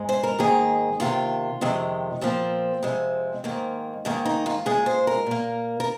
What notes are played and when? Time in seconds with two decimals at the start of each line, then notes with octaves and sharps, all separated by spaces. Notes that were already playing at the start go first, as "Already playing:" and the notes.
Already playing: G#2 G#3
0.09 C5
0.23 A#4
0.38 G#2 D#3 A#3 G#4
1.00 C3 D#3 A#3 F4
1.61 F2 C3 D#3 G#3
2.21 A#2 F3 A#3 C4
2.83 F2 C3 G#3
3.44 G#2 D#3 A#3
4.05 G#2 D#3 A#3
4.25 D#4
4.46 F4
4.66 A#2 G#3 G#4
4.86 C5
5.07 A#4
5.26 A#2 A#3
5.80 A#4